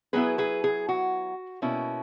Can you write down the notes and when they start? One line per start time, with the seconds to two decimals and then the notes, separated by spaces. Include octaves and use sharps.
0.13 F#3 B3 E4 G#4 B4
0.38 G#4 B4
0.64 G#4
0.89 F#4
1.62 B2 A#3 C#4 E4